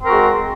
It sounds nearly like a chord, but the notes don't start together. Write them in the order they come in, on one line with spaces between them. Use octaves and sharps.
C4 A#4 F#4 G#3